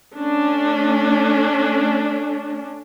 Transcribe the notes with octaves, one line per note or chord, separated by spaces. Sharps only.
A3 C#4 D4